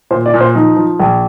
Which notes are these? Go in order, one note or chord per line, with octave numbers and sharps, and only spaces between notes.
A#2 C5
D5
A#2
C5
F3 D#4
F3
A#1